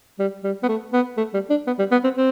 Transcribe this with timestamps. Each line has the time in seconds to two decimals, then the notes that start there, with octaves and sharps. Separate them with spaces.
0.19 G3
0.44 G3
0.63 B3
0.68 A3
0.93 B3
1.18 A3
1.34 G3
1.50 D4
1.67 B3
1.79 G3
1.91 B3
2.04 C4
2.16 C4